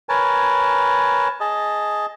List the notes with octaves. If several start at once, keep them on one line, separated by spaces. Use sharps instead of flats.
A#4 B4 C#5 G#5 A5
G#4 D#5 A5